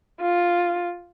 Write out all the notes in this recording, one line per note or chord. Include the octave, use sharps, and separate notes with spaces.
F4